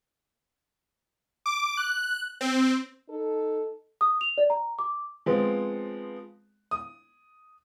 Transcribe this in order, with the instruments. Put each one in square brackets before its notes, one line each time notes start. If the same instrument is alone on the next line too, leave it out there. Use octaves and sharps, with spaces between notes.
[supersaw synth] D6
F#6
C4
[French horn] D#4 [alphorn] A4
[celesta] D#6
F7
D5
A#5
D6
[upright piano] F3 G#3 B3 C4
D#6